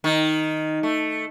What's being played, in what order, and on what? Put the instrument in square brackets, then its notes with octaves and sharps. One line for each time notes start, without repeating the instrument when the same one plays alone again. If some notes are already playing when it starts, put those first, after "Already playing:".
[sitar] D#3
A3